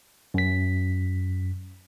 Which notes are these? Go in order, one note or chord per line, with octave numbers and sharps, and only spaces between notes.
F#2 B6